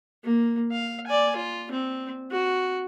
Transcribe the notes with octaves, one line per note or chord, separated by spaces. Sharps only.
A#3
F5
D5 G#5
F4
C4
F#4